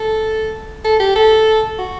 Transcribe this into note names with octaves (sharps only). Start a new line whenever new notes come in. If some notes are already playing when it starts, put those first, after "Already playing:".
Already playing: A4
A4
G4
A4
F#4